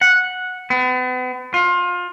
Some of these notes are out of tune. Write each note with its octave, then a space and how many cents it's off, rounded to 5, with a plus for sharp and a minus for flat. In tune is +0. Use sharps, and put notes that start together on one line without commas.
F#5 -10
B3 +40
F4 +25